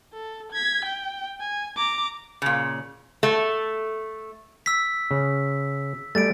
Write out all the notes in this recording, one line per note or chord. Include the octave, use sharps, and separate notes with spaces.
A4
G#6 B6
G5
G#5
A#5 D6
A#2 C#3
A3
E6 B6
C#3
G3 A3 A6 D7